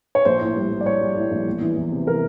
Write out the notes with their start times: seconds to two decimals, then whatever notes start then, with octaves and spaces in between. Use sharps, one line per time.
0.15 C#5
0.25 A#1 C5
0.41 A2
0.56 G3
0.71 G3
0.81 D5
0.86 A2 C#5
1.01 G3
1.16 A2
1.31 A#1
1.46 E2
1.61 E3
1.77 E2
1.92 C3
2.07 E3 A#4